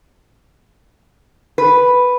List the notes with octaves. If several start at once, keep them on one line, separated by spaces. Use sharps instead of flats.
B4